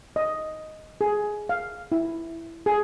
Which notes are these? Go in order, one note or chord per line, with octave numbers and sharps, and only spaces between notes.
D#5
G#4
F5
E4
G#4